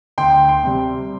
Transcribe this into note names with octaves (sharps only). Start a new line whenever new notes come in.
D2 G5 C6
G5 C6
C3 G3 C4